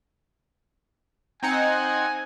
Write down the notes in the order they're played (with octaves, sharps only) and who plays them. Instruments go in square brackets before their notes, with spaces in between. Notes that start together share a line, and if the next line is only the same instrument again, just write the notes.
[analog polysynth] C4 D#4 F#5 [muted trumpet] G#5